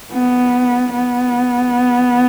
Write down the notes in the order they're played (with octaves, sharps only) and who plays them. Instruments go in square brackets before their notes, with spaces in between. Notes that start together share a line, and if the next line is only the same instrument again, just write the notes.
[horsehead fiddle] B3
B3